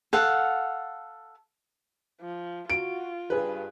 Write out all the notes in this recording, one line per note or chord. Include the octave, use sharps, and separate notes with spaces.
A4 F5 F#5
F3
F4 F#4 D7
G2 G#4 B4